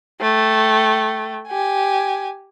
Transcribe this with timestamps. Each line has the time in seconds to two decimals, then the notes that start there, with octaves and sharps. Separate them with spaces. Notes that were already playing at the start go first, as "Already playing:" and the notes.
0.21 A3 G5
1.48 G4 G#5